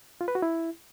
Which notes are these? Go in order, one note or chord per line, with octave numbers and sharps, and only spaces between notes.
F4
B4
F#4
E4